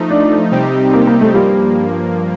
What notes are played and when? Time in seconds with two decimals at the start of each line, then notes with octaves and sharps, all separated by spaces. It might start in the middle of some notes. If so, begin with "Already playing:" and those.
Already playing: F3 A3 D#4
0.10 D4
0.51 C3 G3 C4 D#4 G4
0.94 A#3
1.07 A#3
1.21 A3
1.34 G2 F3 G3 A#3